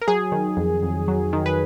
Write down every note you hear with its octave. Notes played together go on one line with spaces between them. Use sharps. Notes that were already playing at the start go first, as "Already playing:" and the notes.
A#4
F#3 G#4
D#3
F2
F2
F#3
D#3
B4